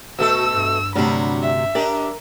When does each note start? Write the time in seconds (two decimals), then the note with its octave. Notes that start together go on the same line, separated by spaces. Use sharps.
0.19 B2 A3 F#4 A4 E6
0.54 G2
0.95 D2 C3 F#3 G3 D4 B5
1.43 E5
1.75 D4 G4 A#4 D5 A#5